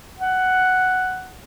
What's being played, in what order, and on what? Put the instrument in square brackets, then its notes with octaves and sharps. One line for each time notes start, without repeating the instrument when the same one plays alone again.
[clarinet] F#5